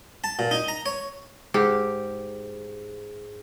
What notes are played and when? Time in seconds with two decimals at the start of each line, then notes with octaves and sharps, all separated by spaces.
0.24 A5
0.39 A#2
0.51 D#4
0.68 A#5
0.86 C#5
1.54 G#2 G4